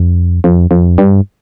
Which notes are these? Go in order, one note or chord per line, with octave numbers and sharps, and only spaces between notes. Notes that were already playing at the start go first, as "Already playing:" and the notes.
Already playing: F2
F2
F2
G2